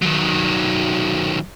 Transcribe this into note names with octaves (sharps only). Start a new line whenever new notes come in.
D#3 F#3